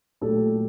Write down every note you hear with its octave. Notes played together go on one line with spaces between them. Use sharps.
A#2 F#3 A3 G4 A4